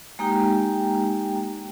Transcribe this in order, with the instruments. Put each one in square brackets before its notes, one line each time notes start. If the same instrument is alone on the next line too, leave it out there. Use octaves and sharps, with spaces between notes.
[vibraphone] G#3 A#3 D#4 G4 G5 A#5